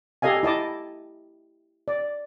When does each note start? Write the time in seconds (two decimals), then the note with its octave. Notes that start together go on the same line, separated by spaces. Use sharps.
0.22 G4 A4 D#5 F5 G#5
0.43 E4 D#5 A5 D6
1.88 D5